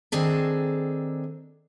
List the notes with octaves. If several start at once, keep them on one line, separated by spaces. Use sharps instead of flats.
D#3 C4 D4 G#4 A4